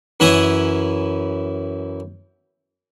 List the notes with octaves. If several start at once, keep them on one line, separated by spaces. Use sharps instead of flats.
F#2 E3 E4 G#5 D#6